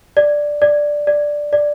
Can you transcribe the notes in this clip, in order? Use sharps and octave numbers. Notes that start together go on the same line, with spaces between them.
D5
D5
D5
D5